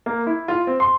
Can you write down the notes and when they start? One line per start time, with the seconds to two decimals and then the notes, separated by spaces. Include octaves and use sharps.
0.06 A#3
0.27 E4
0.48 F4
0.67 C4
0.80 C6